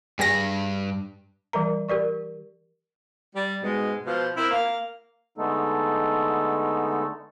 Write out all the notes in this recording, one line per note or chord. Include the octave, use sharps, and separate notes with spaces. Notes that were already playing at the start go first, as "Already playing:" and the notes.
G2 G3 G#4 A#6
E3 G3 A#4 A#5
G4 A#4 D5 C#6
G3
G#2 B2 G#3
B2 F3 C5
C4 E4 A#4
A#3 F5
D3 G#3 A3 B3 D#4 A4